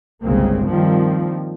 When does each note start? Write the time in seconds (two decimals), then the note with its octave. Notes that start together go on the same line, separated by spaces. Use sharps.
0.22 G1 C2 C#3 G#3 A#3 C4
0.67 G2 D#3 F3 G3 A#3 C4